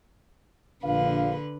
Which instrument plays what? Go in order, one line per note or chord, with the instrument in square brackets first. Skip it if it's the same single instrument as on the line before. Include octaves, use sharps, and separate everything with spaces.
[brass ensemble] A#1 F5 [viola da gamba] D3 B4